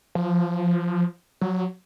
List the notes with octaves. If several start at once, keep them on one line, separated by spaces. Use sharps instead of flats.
F3
F#3